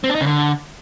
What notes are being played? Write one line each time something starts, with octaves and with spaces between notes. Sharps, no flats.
C4
D4
D#4
C#3
D3